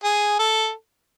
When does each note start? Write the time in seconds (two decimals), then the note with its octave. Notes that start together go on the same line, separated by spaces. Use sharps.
0.04 G#4
0.39 A4